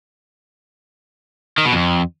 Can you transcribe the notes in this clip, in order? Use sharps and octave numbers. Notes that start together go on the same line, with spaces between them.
D#3
B2
F2